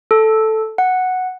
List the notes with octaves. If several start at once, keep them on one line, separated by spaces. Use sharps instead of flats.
A4
F#5